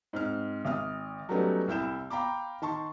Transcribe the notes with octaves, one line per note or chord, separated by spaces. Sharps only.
G#2 C4 F6
G#1 D#6 F6
F#3 G3 A3 B3 C#4 D#4
C2 E4 G6 E7
F5 G5 A#5 B5 D6
D#3 A5 C6 C#6